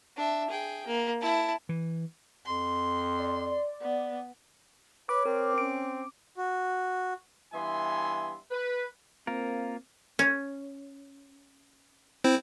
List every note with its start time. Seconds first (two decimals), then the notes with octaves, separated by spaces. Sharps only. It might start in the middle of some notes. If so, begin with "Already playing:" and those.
0.17 D4 E5
0.50 G#4 G5
0.86 A#3
1.21 E4 A5
1.69 E3
2.46 F2 C6
3.20 D5
3.81 B3
5.09 B4 C#5 D6
5.25 C4 A#4
5.58 C#4 D7
6.37 F#4
7.53 G2 E3 B3 E5 G#5 C6
8.51 B4
9.27 A#3 C4 F4 A#4
10.19 C#4
12.24 C4 E4 C5